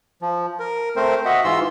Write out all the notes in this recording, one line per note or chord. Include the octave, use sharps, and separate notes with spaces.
F3
A#4
A3 C4 A#4 C5
F#4 D#5 E5 F#5
G#2 E3 F4 C6 E6